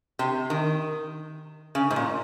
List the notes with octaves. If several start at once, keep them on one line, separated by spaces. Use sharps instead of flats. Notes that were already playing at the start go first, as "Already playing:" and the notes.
C3
D#3
C#3
G#2
A#2